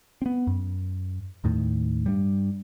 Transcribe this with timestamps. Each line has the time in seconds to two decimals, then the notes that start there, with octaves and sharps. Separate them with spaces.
0.22 B3 C4
0.47 F#2
1.44 D#2 A2 D#3
2.06 G2 G3